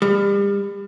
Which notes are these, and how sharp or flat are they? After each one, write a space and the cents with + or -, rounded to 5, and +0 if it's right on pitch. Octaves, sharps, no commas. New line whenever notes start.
G3 +35